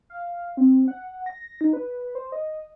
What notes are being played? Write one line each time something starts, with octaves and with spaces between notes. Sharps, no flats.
F5
C4
F#5
A#6
D#4
B4
C5
D#5